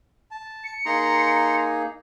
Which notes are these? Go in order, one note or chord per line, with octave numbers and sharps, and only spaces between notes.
A5
C#7
A#3 D#4 G#4 A#5 C6